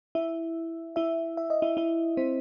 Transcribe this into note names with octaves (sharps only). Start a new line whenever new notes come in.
E4 E5
E4 E5
E5
D#5
E4 E5
E4 E5
C4 C5